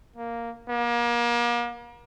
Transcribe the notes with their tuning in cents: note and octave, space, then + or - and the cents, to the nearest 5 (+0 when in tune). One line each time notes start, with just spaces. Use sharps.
A#3 +0
A#3 +35